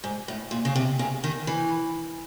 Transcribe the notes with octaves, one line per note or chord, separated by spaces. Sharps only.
G#2
A2
A#2
C#3
C3
C#3
D#3
E3